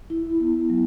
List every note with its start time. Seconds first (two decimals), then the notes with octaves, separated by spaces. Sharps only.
0.10 E4
0.40 B3
0.70 F#3